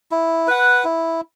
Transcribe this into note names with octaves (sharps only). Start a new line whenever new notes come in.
E4
B4 F#5
E4